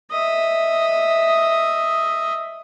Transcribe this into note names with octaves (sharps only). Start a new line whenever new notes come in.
D#5 E5